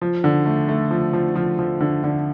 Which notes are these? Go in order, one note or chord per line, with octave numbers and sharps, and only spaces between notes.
F3
D3
A3
A3
F3
F3
F3
F3
D3
D3